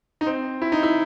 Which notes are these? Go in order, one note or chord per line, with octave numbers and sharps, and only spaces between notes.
D#4
C4
E4
D#4
E4